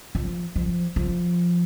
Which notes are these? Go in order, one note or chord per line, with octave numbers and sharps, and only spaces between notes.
F3
F3
F3